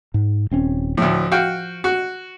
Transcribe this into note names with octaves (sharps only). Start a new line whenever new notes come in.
G#2
D#1 C4 C#4
D2 A2 F3
F#4 F5 G5
F#4